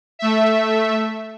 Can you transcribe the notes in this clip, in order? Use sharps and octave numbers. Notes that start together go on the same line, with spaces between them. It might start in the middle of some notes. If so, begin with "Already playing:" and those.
A3 E5